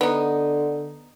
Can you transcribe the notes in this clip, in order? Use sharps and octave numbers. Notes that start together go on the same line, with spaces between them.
D3 B3 D#4